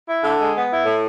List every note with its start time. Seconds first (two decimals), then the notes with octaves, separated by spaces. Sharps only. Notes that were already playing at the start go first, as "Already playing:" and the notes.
0.08 E4
0.24 D3
0.40 G#3
0.55 B3
0.71 E4
0.85 A2